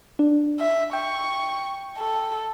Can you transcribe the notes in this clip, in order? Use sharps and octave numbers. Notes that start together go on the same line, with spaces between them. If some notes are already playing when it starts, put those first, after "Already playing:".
D4
E5
G5 C#6
A4